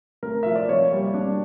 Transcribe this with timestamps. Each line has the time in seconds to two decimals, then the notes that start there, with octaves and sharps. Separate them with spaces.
0.23 A3 A#4
0.43 F3 E5
0.56 D5
0.69 A#3 C#5
0.92 G3
1.14 D4